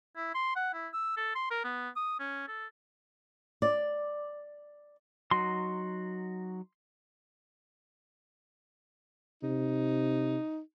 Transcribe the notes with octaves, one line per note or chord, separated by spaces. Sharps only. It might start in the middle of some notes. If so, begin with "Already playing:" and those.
E4
C6
F#5
E4
E6
A4
C6
A#4
B3
D#6
C#4
A4
D5
F#3 D#4 F#4 C6
C3 D#4